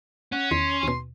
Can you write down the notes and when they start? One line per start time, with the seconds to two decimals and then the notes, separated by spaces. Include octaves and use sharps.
0.32 C#4 F#5
0.51 E2 D#3 C6
0.83 D#2 B2